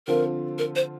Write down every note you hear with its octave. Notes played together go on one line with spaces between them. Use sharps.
D3 F3 C4 F4 A#4
A#4
C5